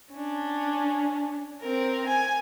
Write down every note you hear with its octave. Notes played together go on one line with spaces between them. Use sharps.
C#4 D4
C4 A#4
G#5